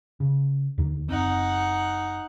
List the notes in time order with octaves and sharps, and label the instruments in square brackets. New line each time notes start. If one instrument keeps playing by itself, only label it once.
[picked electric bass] C#3
D#2 D3 D#3
[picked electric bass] F#1 C4 [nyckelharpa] D#4 F#5